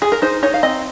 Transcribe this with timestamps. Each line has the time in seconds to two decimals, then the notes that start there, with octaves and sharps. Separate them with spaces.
0.02 G#4
0.12 A#4
0.22 D#4 C5
0.43 D#4 C#5
0.54 F5
0.63 C4 D#5